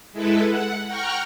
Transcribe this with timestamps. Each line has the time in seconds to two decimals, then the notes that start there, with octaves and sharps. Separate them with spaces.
0.13 G#3 E4 A4 B4
0.47 F#5
0.87 F#5 G5 A#5 C#6 F6